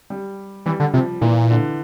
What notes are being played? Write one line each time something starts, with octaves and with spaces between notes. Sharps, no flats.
G3
E3 G3
D3
C3 F3
A#2 E3
D3